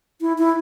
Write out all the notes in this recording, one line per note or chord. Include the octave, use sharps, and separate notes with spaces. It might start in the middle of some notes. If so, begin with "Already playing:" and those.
E4
E4